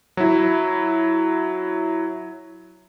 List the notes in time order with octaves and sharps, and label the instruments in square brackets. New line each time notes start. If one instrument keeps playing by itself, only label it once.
[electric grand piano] F#3 E4